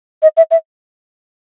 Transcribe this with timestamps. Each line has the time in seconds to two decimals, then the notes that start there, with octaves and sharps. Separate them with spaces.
0.22 D#5
0.37 E5
0.51 E5